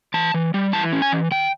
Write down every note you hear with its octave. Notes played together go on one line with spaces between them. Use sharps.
E3 A5
E3
G3
E3 A5
C#4
G#5
E3
D#3 G5